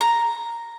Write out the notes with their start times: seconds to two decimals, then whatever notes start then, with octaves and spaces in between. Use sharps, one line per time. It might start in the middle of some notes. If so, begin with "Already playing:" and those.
0.01 A#5